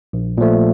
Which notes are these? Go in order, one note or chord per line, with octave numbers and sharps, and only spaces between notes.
A#1
A#2 F3 A3